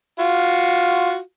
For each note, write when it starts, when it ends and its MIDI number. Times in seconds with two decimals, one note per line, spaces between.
0.19 1.19 65
0.19 1.19 66